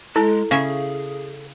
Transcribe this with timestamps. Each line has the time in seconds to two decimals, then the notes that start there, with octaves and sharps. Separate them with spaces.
0.16 G#3 E4 A4
0.51 C#3 C#4 G#4 E5 F5